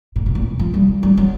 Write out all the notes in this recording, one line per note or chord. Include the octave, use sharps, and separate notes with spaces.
A#2
B2
A#2
F3
G3
G3
F#3